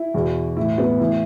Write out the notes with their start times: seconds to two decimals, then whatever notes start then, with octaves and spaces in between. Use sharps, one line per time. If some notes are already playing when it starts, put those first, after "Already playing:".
Already playing: E4
0.14 E2 B2
0.57 A2 E3 E4
0.78 B3
1.00 A2 E3 E4